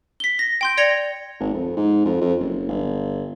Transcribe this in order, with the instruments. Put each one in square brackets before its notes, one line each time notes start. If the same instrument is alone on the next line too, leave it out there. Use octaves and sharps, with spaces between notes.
[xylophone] B6 G7
A#6
G5 C6 G6
D5 G#6 A#6 C#7 F7 G7
[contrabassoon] G#1
F2
G#2
F2
F2
F#1
G1